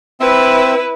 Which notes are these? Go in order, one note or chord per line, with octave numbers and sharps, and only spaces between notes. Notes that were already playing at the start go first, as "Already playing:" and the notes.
C4 E4 B4 E5